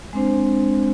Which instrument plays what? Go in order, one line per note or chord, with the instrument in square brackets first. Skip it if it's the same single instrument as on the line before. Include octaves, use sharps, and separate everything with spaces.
[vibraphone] G#3 C4 D4 C5